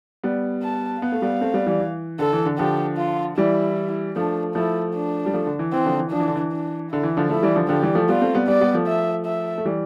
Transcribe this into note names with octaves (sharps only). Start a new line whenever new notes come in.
G3 B3
A5
B3 F5
A3
G3 B3
A3 C4
G3 B3
E3 G3
E3
D3 A4
E3
D3
D3 F3 G4
F4
E3 G3 E4
F3 A3 D4
F3 A3 E4
D4
G3
F3 A3
D3
E3
E3 C4
D3 F3
E3
F3 D4
E3
D3
E3
D4
D3 E4
E3
D3 F3
F3 A3 E4
E3 G3
D3 F3
D3 F3 G4
E3 G3
F3 A3
G3 B3 F4
A3 C4
G3 B3
G3 B3 D5
G3 B3
F3 A3
E5
E5
A3
E3 G3